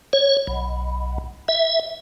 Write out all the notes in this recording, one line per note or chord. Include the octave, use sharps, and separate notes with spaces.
C#5
B1
E5